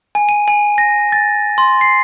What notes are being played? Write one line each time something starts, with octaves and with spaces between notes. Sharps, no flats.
G#5
D#7
G#5
A#6
A6
C6
C7